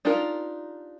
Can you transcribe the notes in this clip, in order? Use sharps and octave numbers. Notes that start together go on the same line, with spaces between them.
D4 D#4 F4 G4 A#4